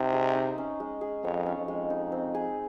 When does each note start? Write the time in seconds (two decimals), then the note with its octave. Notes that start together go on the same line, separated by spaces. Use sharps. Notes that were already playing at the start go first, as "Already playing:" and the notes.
Already playing: C3 D#4 D#5
0.13 G#4
0.35 D#4
0.58 C#4
0.80 G#3
1.01 G#4
1.24 F2 C#5
1.46 C#4
1.57 F2
1.68 G#3
1.90 D#4
2.12 C4
2.35 G#4